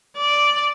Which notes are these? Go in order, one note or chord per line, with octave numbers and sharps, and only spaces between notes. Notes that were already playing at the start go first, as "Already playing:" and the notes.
D5